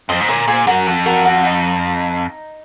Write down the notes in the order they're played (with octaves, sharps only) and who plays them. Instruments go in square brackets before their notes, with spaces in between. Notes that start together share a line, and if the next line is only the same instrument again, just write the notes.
[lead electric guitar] F2 [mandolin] C5 D#5
[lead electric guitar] G#2
[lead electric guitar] A#2 [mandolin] A#4 C#5
[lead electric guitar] A#2 [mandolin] G#4 C5
[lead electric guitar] F#2 [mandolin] F#4 A#4
[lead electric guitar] F2
[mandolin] F#4 A#4
F#4
D#4